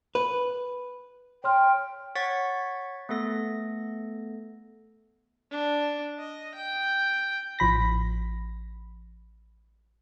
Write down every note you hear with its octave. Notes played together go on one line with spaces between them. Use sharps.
B4
C#5 G5 C6 F6
C#5 F#5 C#6 A6 B6
A3 B3 A4 A#6
D4
D#5
G5
A1 F3 B5 A#6